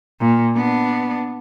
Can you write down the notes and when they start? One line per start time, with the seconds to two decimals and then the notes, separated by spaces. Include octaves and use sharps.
0.20 A#2
0.56 B3 D4